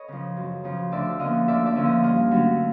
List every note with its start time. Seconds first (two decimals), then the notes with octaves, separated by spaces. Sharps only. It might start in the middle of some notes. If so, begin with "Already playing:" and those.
Already playing: A4 B4 C#5 D#5
0.08 C#3 F3
0.37 F#2
0.64 C#3 F3
0.92 D2 D5 E5
1.19 D3 F3 A#3 C#4 D#5 F5
1.47 D2 D5 E5
1.66 D5 E5
1.75 D3 F3 A#3 C#4
1.85 D#5 F5
2.03 G2 D#5 F5
2.31 D3 F#3 A3 C#4